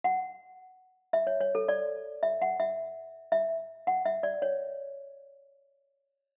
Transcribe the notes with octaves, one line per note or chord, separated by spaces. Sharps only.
F#5
E5
C#5
C#5
A4
D5
E5
F#5
E5
E5
F#5
E5
D5
C#5